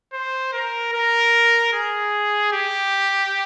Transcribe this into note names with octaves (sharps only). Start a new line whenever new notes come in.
C5
A#4
A#4
G#4
G4